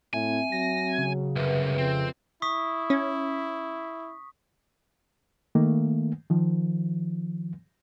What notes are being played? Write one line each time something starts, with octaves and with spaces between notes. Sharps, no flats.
A2 C4 E5 G#5
F#3 A#6
C#3
C2 F#2 B4 E5
F2 C4
E4 C#6 D#6 B6
C#4
D#3 A3 A#3
D#3 F3